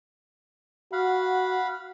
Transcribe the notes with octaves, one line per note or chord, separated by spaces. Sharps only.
F#4 F5 F#5 B5